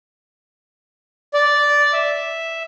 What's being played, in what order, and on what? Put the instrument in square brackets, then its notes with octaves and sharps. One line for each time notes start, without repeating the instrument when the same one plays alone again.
[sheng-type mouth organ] D5
E5